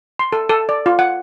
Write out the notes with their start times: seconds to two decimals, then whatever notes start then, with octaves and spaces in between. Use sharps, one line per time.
0.19 C6
0.33 A4
0.49 A4
0.69 D5
0.86 F4
0.99 F#5